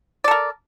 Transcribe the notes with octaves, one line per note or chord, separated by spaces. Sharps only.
A4 A#4 D5